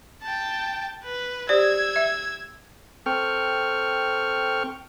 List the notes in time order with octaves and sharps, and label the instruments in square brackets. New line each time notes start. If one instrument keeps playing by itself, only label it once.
[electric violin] G5 A5
B4
[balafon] G4 C5 D5 [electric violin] E6 G#6
[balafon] E5
[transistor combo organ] C4 A4 G5 C#6 F6